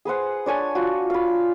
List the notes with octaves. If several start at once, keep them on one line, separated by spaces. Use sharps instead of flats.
G#4 B4 C5 F#5
D4 C#5 G#5 A5
F4 F#4
F5 B5